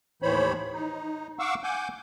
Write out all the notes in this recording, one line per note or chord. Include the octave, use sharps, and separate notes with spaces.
D#2 A2 E3 C5 C#5 B5
D#4
F5 F#5 C#6 D6 E6
F#5 G#5 D6 G6